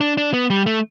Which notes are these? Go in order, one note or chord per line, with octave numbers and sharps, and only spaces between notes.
D4
D4
B3
G3
A3